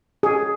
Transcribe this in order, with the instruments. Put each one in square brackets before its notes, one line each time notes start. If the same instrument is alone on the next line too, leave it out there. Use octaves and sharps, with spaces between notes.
[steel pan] G#4